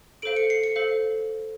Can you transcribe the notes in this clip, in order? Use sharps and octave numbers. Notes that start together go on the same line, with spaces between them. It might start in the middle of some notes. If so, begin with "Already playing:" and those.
A4 C5 F5 D7
C#7
C7
C#7
A4 C5 F5